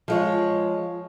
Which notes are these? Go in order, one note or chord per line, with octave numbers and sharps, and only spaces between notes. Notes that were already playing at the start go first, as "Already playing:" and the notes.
F3 G#3 C#5